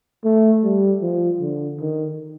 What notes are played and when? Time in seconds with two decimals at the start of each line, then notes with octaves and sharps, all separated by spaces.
0.24 A3
0.64 G3
1.02 F3
1.41 D3
1.80 D#3